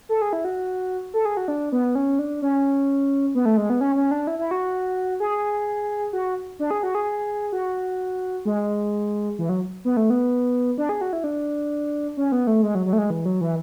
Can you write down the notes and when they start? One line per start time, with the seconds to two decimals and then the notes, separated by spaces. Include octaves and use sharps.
0.09 A4
0.22 G#4
0.33 E4
0.45 F#4
1.14 A4
1.25 G#4
1.37 F#4
1.48 D4
1.72 B3
1.95 C#4
2.19 D4
2.42 C#4
3.35 B3
3.45 A3
3.58 G#3
3.70 B3
3.81 C#4
3.96 C#4
4.11 D4
4.27 E4
4.39 E4
4.51 F#4
5.20 G#4
6.13 F#4
6.59 D4
6.71 G#4
6.83 F#4
6.95 G#4
7.53 F#4
8.45 G#3
9.39 E3
9.49 F#3
9.85 B3
9.97 A3
10.10 B3
10.78 D4
10.89 G#4
11.01 F#4
11.13 E4
11.24 D4
12.17 C#4
12.32 B3
12.47 A3
12.63 G#3
12.75 F#3
12.86 F#3
12.93 A3
12.98 G#3
13.10 E3
13.25 F#3
13.41 E3